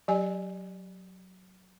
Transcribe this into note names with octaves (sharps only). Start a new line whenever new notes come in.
F#3 G4 D5 G#5